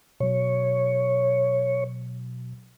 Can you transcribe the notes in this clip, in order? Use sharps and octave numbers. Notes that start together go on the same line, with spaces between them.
B2 F#3 C#5